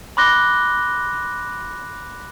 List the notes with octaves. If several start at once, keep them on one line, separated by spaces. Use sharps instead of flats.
B5 C6 D6 F#6 A#6 G7